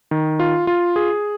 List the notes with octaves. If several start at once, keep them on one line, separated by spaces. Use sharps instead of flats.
D#3
F4
F4
G#4